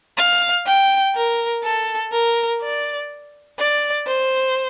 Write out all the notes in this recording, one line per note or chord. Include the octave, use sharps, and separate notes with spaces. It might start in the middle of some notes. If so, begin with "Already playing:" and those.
F5
G5
A#4
A4
A#4
D5
D5
C5